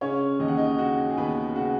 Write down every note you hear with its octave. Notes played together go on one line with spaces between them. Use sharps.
C#3 C#4 C#5
D#2 D#5
F#5
D#4 D#5
C#3 F#4 F#5
G#4
D#2 B3 B4
C#3 F#4 F#5